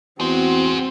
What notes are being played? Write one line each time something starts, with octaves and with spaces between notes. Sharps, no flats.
E2 C4 F#4 G#4 C5